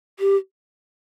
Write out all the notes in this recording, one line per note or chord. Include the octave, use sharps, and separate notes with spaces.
G4